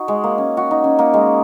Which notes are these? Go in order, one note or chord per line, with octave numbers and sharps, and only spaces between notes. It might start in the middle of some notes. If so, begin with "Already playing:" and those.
Already playing: D#4 F#4
G#3
A#3
C#4
F#4
D#4
C#4
A#3
G#3